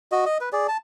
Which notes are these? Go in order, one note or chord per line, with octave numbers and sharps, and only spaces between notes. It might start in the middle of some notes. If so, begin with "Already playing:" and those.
F#4 D#5
D#5
B4
G#4 D5
A5